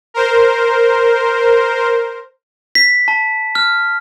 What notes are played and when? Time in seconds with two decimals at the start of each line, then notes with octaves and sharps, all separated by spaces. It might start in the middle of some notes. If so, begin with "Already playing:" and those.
0.14 A#4 C5
2.75 B6
3.08 A5
3.55 F6